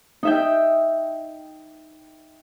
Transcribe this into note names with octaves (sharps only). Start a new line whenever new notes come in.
D#4 E5 G5